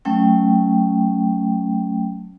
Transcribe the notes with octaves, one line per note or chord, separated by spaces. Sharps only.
F#3 A3 C#4 G5